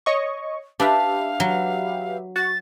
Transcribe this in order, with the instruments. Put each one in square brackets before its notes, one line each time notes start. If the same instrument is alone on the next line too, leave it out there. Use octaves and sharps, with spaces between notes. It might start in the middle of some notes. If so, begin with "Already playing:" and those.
[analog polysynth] C#5 D#5 C#6
[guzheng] D4 [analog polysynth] G4 B4 E5 [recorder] F5
[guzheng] F#3
[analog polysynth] F#4 [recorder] A6